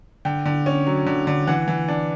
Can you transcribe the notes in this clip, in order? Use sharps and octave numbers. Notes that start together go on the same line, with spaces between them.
D3 G5
D3
C#4
F#3
D3
D3
E3 F#5
E3
D4